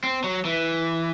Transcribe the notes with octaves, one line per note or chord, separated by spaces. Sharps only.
C4
F#3
E3